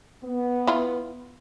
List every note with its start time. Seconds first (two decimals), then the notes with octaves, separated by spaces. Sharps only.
0.25 B3
0.67 E4 F4